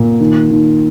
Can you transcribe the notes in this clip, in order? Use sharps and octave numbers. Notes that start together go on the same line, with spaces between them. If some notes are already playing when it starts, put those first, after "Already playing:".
Already playing: A#2
D#3
D#3